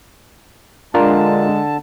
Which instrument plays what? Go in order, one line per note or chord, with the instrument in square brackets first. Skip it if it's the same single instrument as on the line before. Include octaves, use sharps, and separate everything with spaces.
[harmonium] D3 A5 [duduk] G#3 [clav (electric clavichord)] D4 F4 A#4